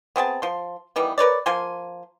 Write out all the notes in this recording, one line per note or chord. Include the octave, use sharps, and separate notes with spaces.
B3 C4 G#4 A5
F3 C6
D#3 E3 G3 B3
A#4 B4 C#5 D5
F3 A#3 G#5 C6